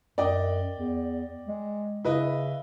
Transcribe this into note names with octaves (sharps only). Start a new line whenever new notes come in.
F#2 D5 D#5 G5
E2
G#3
C#3 E4 B4 D#5